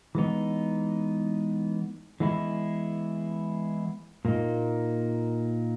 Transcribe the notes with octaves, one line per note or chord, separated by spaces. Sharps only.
E3 G#3 B3 D#4
E3 G#3 B3 E4
A#2 A#3 D#4